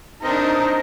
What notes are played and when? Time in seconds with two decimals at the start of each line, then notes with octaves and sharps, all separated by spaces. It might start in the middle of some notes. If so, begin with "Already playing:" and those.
0.22 C4 D4 D#4 A#4 D#5